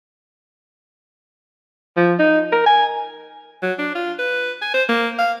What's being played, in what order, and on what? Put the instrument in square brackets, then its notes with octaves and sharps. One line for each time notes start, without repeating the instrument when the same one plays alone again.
[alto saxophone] F3
D#4
A#4
G#5
F#3
D4
F4
B4
G#5
C5
A#3
F5